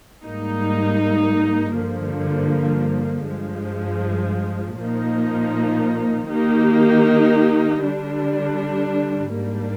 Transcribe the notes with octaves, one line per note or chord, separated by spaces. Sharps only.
G#2 G3 A#3 D#4
G2 D3 F3 A#3
G2 F3 G#3
A#2 F3 A#3 D#4
D#3 A#3 D#4 G4
D3 G3 D4
G#2 G3 A#3 D4